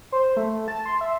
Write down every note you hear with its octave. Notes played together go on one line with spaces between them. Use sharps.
C5
A3
A5
C6
E5